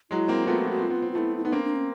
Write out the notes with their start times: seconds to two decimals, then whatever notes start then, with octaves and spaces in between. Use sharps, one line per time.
0.11 F#3 G#3 E4
0.28 A#3 C4
0.47 A3 B3 F4
0.58 F#4
0.65 B3
0.70 F#4
0.78 C4 F4
0.90 B3
1.02 C4
1.12 F4
1.15 A3 B3 E4
1.37 E4
1.44 B3 D#4
1.52 A#3 C4 D4
1.64 D4
1.75 C#4